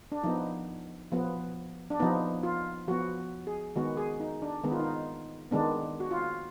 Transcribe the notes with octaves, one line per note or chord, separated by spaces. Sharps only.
D4
F3 B3 D#4
F3 B3
D4
F3 B3 D#4
F4
F3 B3 F#4
G#4
D#3 G#3 B3 F#4
G#4
D#4
D4
D#3 G#3 B3 D#4
F4
D#4
D#3 G#3 B3 D4
F#4
F4